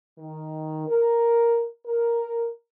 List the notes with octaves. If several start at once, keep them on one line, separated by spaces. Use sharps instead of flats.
D#3
A#4
A#4